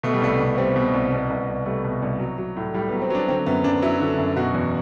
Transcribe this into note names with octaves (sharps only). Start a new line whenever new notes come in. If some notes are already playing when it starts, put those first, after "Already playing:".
B2 A3
G3
C2 A3
C2
G3 C4
B2
C2
B2
C2
C2
G3 A3
B2
C2
F#3
F#3
A2
A2 G3
B3
F#3
C4
F#3 D4
D3 C4
F#2 B3
F#2 D4
F#3 E4
D3
F#2
B2 F#4
E2